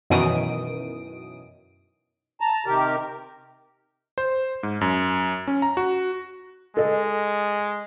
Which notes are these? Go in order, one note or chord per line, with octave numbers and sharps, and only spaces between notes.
F#2 B2 D#3 E3 D#6 D7
A5 A#5
C3 D#3 G4 A#4
C5
G#2
F#2
C#4
A#5
F#4
G#3 A4 D#5